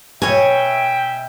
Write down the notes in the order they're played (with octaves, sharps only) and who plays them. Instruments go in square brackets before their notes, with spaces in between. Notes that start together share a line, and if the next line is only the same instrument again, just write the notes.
[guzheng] B2 C#5 [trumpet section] E5 G5 [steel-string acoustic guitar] G#5